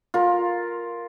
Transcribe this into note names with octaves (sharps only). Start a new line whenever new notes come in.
F4 A#4